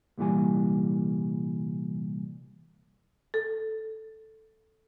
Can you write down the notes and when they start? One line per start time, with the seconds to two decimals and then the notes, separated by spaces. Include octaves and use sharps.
0.18 C2 A#2 E3 G3 G#5
3.34 A4